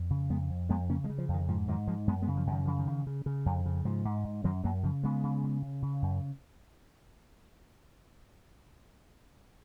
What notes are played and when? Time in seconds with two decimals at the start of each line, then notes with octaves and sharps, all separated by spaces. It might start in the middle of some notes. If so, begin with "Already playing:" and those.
Already playing: F2
0.10 C#3
0.30 F2 G#3 B3
0.50 F2
0.69 F2 G#3 B3
0.89 C#3 A#3 C#4
1.04 F3 G#3
1.09 C#3
1.18 F3
1.28 F2
1.34 D#3
1.48 G#2 F3
1.68 G#2 D#3 F#3
1.87 G#2 F3 G#3
2.07 F#2 G#3 B3
2.22 G#3 B3
2.28 C#3
2.37 F3
2.47 F#2 D#3
2.65 C#3 F3
2.79 D#3
2.87 C#3
3.07 C#3
3.26 C#3
3.46 F2
3.66 C#3
3.85 G#2 F3
4.05 G#2
4.24 G#2
4.44 F#2 D#3 F#3
4.64 F#2 F#3 A#3
4.83 C#3 F3
5.03 C#3 G#3 B3
5.23 C#3
5.43 C#3
5.62 C#3
5.82 C#3
6.02 F#2